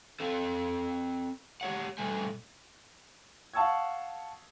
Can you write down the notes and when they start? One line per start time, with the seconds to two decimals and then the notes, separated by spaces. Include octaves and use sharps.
0.20 C4 A4
1.61 G4 C#5 F#5
1.98 B2 G3 A3 G#5
3.54 F5 F#5 A5 C#6 E6 G#6